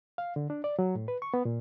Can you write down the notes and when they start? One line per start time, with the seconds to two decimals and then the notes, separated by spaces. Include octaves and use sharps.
0.18 F5
0.36 D3
0.50 D4
0.64 D5
0.79 F#3
0.95 A2
1.08 B4
1.22 C#6
1.34 B3
1.45 A#2